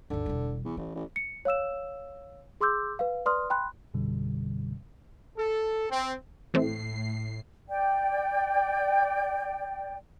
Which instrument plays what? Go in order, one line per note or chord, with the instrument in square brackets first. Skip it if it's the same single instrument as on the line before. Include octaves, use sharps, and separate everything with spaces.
[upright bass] G#1 D#2 [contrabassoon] D3
[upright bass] E1 G3
[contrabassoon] E2
[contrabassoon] A1 [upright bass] E3
[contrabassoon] A1
[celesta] C#7
C#5 F5 E6 E7
G#4 C6 D6 E6 G6
B4 F5
B4 D5 C6 D#6 F6
G5 B5 C6 F#6
[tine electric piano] A1 F#2 B2 D3 G3
[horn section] A4
C4
[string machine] A2 C7 [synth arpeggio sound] E3 A3 C4
[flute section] D5 G5